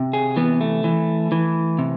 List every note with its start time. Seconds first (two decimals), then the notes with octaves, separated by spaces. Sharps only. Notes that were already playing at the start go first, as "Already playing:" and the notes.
Already playing: C3
0.13 G#4
0.36 E3 B3
0.61 A3
0.84 E3
1.32 E3
1.79 C3